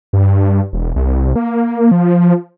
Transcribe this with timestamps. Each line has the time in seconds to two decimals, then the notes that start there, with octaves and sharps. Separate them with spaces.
0.13 G2
0.73 E1
0.96 C2
1.36 A#3
1.91 F3